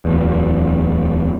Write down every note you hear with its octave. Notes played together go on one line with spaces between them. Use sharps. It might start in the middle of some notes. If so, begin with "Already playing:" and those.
D1 E2